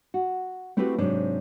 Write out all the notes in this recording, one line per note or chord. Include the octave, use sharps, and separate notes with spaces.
F#4
A3 C4 E4 F#4 G4 B4
G#2 C3 F#3 D4